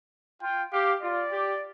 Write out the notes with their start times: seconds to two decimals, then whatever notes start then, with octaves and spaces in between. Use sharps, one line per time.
0.42 F4 G5
0.73 G4 F5
1.02 F4 D5
1.32 G4